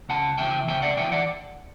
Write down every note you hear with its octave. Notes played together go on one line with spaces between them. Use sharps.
C#2 F#5 A5
C#3 E3 E5 G5
C#2 E5 G5
D5 F#5
C#3 E3 E5 G5
D5 F#5